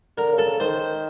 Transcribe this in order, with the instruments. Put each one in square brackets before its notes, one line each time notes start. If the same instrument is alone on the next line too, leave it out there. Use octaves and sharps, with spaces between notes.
[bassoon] D3 [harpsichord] A#4
[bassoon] C#3
[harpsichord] A4
[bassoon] C#3
[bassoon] D#3 [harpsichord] C5